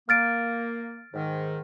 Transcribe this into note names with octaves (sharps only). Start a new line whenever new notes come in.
A#3 F6 A6 D7
G#2 D#3